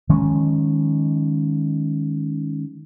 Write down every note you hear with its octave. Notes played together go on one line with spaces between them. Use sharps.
D#3 F3 G#3 C#4